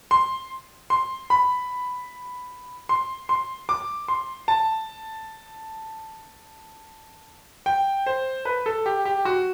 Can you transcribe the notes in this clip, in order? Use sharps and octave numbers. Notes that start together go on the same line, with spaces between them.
C6
C6
B5
C6
C6
D6
C6
A5
G5
C5
B4
A4
G4
G4
F#4